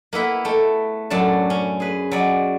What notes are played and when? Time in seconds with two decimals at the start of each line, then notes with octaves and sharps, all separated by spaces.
0.13 A#3 B3 E4 B4
0.45 A3 G5
1.10 F#2 A2 F#3 D4 A5
1.50 C#4
1.80 G#4 B4
2.11 F#3 D5 D#5